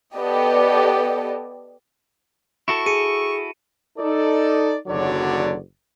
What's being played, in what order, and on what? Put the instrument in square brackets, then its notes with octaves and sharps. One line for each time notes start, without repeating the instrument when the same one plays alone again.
[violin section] B3 G4 A4 D5 D#5
[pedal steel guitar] E4 F#4 A4 [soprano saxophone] C#6
[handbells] G#4 [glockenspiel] C#7 D#7
[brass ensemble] D#4 A4 D5
F#1 D#2 D3 F#3 C#5 D5